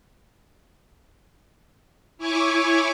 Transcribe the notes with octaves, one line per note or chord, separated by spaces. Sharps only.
E4 C#5 G#5 C#6 D6